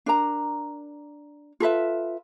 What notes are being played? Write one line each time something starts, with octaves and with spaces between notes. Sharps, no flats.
D4 A#4 A#5
F4 A4 B4 E5